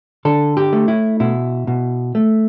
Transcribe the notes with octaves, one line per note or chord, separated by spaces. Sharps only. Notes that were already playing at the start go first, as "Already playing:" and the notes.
D3 A4
G4
A3
E4
B2 E4
B2
A3